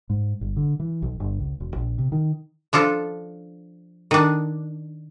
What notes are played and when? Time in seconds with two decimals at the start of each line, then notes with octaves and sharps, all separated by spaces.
0.10 G#2
0.41 G1
0.57 D3
0.80 E3
1.02 B1
1.20 G1
1.39 C#2
1.60 E1
1.76 A#1
1.98 C3
2.12 D#3
2.73 F3 D4 F4 A4
4.11 D#3 D4